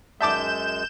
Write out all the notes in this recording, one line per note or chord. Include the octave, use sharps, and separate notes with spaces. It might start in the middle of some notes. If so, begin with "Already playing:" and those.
F#2 G#3 E5 A5 D6 G6 E7